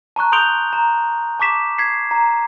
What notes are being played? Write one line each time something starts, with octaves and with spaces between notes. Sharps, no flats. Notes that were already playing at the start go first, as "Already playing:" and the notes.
A5 A#5 C#6 F#6
C6 D#6 G6 D7 F7 G7
A#5
A5 C#6 D6 B6 E7
G#6 B6 C7
A#5